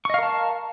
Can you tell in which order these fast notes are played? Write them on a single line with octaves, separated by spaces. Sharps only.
C#6 D#5 F5 A#4 A5